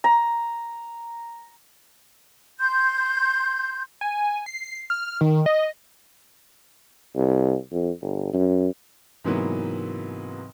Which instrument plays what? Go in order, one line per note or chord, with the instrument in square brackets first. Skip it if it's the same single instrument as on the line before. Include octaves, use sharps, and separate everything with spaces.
[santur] A#5
[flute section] C6 G6
[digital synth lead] G#5
C7
F6
D#3
D#5
[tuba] C2
F2
G1
F#2
[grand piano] G#2 C3 E3 F#3 A#3 B3